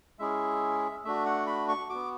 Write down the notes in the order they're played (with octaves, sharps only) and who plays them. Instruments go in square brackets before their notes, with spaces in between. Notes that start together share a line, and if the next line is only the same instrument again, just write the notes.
[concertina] G#3 C#4 E4 G#4 E5
A3 D4 F#4 E5
F#5
B5
C#6
B3 F#4 D6